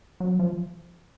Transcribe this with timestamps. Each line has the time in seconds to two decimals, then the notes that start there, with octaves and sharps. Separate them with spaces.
0.20 F#3
0.39 F3